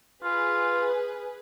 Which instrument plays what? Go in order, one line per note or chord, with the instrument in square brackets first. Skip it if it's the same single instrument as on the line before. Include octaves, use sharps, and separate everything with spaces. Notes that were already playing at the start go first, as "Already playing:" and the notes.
[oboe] F4 [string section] G#4 B4